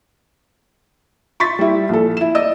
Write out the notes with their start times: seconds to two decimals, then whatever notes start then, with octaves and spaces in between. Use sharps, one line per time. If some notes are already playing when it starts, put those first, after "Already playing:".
1.40 C6 C#6 A6 B6
1.59 G3 E4
1.89 A#1 A4
2.17 E4 E7
2.35 D5 D#5 E6